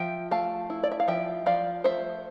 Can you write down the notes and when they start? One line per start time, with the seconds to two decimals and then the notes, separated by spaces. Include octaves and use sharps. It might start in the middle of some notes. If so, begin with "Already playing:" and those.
Already playing: F3 E5 G5
0.31 A3 F5 A5
0.70 E4
0.83 D5
0.92 E5
1.00 F5
1.08 F3 E5 G5
1.46 F3 D5 F5
1.84 A3 C5 E5